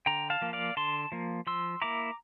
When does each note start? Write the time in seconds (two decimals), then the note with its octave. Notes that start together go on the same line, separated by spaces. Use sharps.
0.06 D3 G5 A#5
0.30 F5 A5
0.42 F3 A#3
0.53 D5 F5
0.77 D3 A5 C6
1.12 F3 A#3
1.47 F3 C6 E6
1.82 A#3 E4 A#5 D6